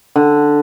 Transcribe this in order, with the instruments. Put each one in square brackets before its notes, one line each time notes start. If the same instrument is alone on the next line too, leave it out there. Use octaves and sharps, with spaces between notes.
[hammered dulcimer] D3